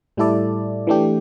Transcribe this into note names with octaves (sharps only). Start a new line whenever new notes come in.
A2 G3 E4 A4 D5
E3 A3 D4 G4